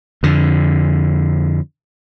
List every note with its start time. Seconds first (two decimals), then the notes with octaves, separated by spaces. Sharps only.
0.23 F2 D3